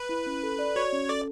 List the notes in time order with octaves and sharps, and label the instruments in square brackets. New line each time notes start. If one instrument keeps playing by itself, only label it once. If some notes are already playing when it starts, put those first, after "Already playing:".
Already playing: [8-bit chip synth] B4
[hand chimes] E4
C#4
A4
D5
[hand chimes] F#4 [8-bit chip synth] C#5
[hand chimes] C#4
[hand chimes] A4 [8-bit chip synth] D5